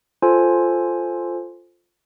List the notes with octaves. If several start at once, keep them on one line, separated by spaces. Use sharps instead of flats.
F4 A4 C5 G#5